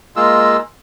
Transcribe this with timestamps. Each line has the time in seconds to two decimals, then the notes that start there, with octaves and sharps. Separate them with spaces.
0.16 G#3 A#3 F4 E6